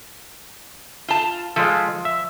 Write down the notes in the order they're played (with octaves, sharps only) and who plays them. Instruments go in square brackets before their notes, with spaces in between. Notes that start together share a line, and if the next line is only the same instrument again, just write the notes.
[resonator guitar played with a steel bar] F4 A5
[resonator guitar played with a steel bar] F3 [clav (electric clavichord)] G#3 F4 A4
[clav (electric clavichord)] E5